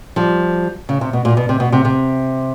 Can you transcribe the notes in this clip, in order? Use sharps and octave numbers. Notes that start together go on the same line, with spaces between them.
F3 G3
C#3
C3
B2
A#2
B2
C3
B2
C3
C3